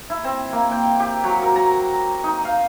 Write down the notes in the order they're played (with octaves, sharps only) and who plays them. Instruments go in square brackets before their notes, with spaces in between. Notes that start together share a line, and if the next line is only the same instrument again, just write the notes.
[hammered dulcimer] E4
C4
A#3
G5
G4
F#3
A#4
A#5
D#4
F5